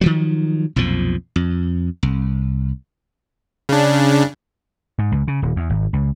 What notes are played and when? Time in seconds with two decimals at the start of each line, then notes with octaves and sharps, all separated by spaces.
0.01 D#3 F3 F#3
0.76 B1 F2 A#2 F3
1.36 F2
2.03 C2
3.69 C#3 D4
4.99 G#2
5.12 C#2
5.28 C#3
5.42 D#1
5.56 E2
5.70 G#1
5.93 C#2